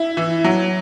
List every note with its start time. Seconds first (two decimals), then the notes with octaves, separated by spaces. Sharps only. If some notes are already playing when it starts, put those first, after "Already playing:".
Already playing: E4
0.17 E3
0.44 F#3